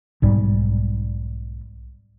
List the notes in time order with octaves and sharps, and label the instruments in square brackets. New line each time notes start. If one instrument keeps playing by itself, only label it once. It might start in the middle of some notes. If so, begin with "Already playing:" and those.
[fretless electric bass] B1 G#2 G3